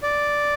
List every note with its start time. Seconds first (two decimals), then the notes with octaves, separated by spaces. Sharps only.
0.03 D5